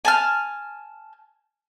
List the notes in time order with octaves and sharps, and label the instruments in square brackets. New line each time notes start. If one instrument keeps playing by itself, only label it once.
[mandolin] G#5 A5 F6